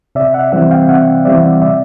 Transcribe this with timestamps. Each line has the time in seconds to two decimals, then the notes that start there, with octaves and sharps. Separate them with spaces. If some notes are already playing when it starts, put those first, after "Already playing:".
0.15 C3 D5 E5
0.34 E5 F#5
0.52 E3 G3 C4 E5 F#5
0.71 F5 G5
0.88 C3 E5 F#5
1.25 E3 G3 C4 D5 E5
1.62 C3 D5 E5